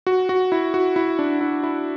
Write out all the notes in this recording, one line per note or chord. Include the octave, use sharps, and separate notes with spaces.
F#4
F#4
E4
F#4
E4
D4
E4
E4